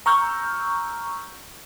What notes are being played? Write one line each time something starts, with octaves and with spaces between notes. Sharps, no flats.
A#5 C#6 E6 F6 G6